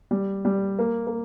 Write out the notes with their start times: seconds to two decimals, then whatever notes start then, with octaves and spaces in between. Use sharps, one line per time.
0.11 G3
0.45 G3
0.79 A#3
1.07 A#3